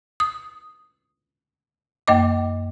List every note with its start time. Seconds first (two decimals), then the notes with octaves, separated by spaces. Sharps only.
0.20 D#6
2.08 F#2 A#3 D#5 D6